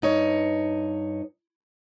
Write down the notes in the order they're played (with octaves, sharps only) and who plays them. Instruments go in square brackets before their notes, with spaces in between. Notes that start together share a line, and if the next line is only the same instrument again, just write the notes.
[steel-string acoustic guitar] G2 D#4 C#5